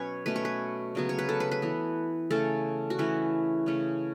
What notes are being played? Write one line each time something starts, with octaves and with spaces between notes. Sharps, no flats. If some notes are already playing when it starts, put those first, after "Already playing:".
Already playing: B2 F#3 C#4 B4 C#5
B2 A3 C#4 B4
C#5
B4
C#3 F#3 B3
C#5
B4
A4
B4
B4
E3 B3
C#3 A3 C#4 A4
F#4
E3 A3 C#4 E4
C#3 A3 C#4